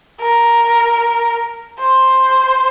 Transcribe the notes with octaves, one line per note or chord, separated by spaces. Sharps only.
A#4
C5